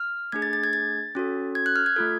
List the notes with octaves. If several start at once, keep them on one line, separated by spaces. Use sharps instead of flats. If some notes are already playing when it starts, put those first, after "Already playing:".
Already playing: F6
A3 D4 G#4 G#6
A6
A6
G#6
A6
C#4 F#4 A4
G#6
F#6
F6
G#6
A3 F4 A4